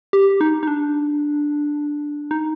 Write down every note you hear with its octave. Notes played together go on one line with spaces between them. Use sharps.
G4
D#4
D#4
D4
D#4